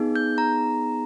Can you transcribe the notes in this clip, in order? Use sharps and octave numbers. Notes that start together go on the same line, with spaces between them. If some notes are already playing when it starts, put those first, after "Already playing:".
Already playing: B3 D#4 G#4
G6
A#5